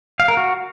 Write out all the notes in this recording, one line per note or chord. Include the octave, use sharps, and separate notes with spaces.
F5
A#4
F#4